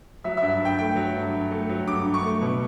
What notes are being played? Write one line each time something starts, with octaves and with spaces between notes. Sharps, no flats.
F#3 E5
G2 E5
G2 G5
A3 G5
F#3
G2
G2
A3
F#3
G2 D6
G2
C#6
A3
B2